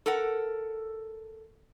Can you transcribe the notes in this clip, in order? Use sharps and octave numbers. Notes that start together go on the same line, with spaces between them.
A4 A#4 F#5